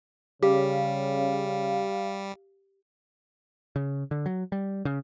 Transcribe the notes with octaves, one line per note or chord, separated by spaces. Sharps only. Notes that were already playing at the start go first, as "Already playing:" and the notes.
C#3 G3 G4 F5
C#3
D3
F#3
G3
C#3